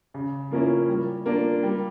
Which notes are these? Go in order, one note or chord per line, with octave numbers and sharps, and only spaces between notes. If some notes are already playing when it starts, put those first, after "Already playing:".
C#3
F3 A#3 C#4 E4
G3
A#3 D4 F4
G3